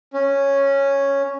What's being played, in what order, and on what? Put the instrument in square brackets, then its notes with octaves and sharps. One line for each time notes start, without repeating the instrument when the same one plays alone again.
[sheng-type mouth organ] C#4